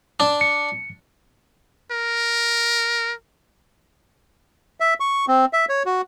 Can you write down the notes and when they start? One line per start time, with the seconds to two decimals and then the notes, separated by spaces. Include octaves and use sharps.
0.20 D4
0.41 C#7
1.91 A#4
4.80 E5
5.00 C#6
5.28 C4
5.53 E5
5.69 C#5
5.86 F#4